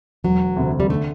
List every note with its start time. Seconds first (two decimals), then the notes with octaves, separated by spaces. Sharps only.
0.24 E1 F#3
0.56 D2 C3
0.80 G3
0.89 D3 A3